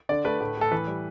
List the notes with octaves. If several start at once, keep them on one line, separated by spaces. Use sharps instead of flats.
D3 D5
A3 B4
A2
A2 A4
E3 B4
G3